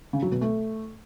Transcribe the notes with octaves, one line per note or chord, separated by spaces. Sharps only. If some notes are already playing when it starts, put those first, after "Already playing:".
C#3
F#3
B2
A3